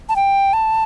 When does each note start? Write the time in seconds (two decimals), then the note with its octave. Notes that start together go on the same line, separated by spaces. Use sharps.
0.09 A5
0.16 G5
0.53 A5